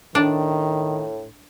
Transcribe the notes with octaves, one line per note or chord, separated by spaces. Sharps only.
A2 D#3 D4